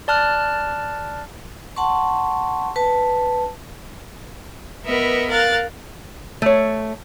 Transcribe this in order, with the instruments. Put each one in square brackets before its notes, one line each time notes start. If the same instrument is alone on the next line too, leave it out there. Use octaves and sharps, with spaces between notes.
[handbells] D5 A5 F6 F#6
[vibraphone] F#5 A5 C6 C#6
B4 A5
[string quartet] B3 A#4 B4 D#5 E5
A#4 F5 F#6 A6
[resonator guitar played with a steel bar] A3 C#5